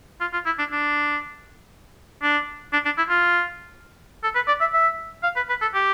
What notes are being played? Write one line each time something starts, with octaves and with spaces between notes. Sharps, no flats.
F4
F4
E4
D4
D4
D4
D4
D4
E4
F4
A4
B4
D5
E5
E5
F5
B4
B4
A4
G4